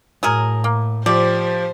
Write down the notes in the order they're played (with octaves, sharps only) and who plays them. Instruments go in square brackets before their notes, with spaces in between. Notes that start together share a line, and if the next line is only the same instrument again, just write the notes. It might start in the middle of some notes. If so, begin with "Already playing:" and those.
[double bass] A2 [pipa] F#3 G#4 A#4
[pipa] A#3
[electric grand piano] F3 G4 [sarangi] C5 [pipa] D5